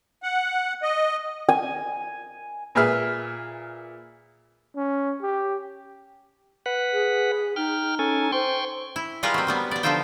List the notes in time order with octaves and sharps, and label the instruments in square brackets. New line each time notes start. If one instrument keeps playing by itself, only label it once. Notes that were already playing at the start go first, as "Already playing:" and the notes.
[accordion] F#5
D#5
[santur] G#5
[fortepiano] A#2 G#4 B4 E5 F6
[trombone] C#4
G4
[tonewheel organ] B4 F#5
[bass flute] G#4
[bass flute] D#4 [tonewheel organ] G5 F6
[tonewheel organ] C#4 A4 G#5
[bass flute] C5 [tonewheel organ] G5 C6 C#6
[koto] E4
G3 G#3 F4 A#4 B4 D#5
F#3 C4
F#3 G3 B3
B3 D5
D3 F3 D#4 F4 E5 G5